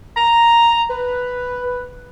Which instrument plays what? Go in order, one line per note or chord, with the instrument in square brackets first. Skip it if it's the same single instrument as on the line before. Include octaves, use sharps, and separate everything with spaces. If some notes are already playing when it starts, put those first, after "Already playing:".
[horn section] A#5
B4